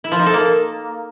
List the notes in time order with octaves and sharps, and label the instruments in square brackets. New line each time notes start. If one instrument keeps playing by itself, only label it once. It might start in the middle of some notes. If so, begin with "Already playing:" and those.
[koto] E4
F3
D#4
A4
A#3